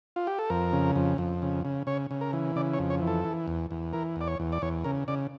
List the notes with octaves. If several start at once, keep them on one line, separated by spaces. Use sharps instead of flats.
F4
G4
A4
F2 A#4
C#3
F2
F2
C#3
C#3
C#3 C#5
C#3
A#4
E3
C#3 D5
C#5
F2
C#5
E3
A4
E3
E2
E2
E3 A#4
E2 D5
C#5
E2
D5
E2 C#5
C#3 A#4
C#3 D5